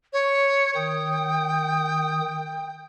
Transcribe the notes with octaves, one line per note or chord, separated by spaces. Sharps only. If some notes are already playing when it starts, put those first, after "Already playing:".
C#5
D#3 G5 D#6